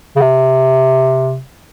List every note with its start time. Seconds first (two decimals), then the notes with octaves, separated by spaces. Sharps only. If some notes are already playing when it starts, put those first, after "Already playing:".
0.16 C#3
0.21 C3